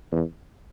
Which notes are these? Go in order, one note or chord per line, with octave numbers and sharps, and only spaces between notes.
E2